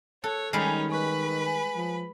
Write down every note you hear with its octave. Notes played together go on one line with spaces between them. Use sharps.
A4 C#5 F#6
D#3 G3 G#3 C#4 D#4 B5 F6
B4 G#5 B5 C#6 F#6
G#5
F3